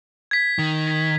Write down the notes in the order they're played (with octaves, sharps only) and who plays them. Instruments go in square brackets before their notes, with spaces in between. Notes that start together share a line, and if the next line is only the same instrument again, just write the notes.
[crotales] G#6 B6
[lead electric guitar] D#3